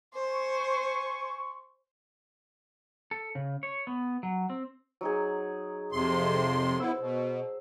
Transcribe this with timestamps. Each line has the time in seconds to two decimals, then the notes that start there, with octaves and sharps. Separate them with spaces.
0.14 C5 G#5 C6 C#6
3.11 A4
3.35 C#3
3.63 C#5
3.87 B3
4.23 F#3
4.50 C4
5.01 F#3 D#4 G#4
5.92 F2 C3 C6
6.80 B3 E4 C5 E6
6.99 B2